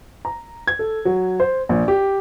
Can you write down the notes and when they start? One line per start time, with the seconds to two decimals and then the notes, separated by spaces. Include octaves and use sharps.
0.25 A#5
0.67 G#6
0.79 A4
1.05 F#3
1.40 C5
1.69 A#1
1.88 G4